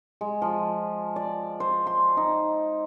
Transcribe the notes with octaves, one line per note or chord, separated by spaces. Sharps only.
G#3
F3
D5
C5
C6
D#4